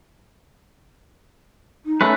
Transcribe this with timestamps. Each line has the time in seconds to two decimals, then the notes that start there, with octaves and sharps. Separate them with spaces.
1.86 D#4
2.01 A3 C#4 B4